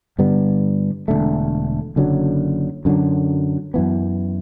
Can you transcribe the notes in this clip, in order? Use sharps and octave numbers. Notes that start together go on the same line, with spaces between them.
G2 D3 G3 B3
E1 E2 D3 A3
F#1 F#2 D3 F#3
F#2 D3 F#3
F#2 E3 B3